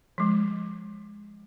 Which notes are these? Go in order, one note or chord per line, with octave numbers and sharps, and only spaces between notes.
F3 G#3